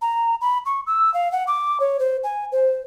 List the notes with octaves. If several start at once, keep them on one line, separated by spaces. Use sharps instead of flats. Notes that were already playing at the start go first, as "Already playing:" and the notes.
A#5
B5
C#6
E6
F5
F#5
D6
C#5
C5
G#5
C5